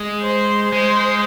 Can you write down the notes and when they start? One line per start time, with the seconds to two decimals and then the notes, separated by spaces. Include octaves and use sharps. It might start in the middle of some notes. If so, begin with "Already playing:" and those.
Already playing: G#3
0.22 C5
0.73 G#3 C5